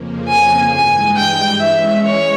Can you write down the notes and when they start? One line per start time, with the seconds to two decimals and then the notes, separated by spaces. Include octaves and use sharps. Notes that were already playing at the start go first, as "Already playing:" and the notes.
Already playing: F2 C#3 F3 A#3
0.28 G#5
0.72 G2 E3 G#3 G#5
1.16 G5
1.60 E3 G#3 C#4 E5
2.05 C#5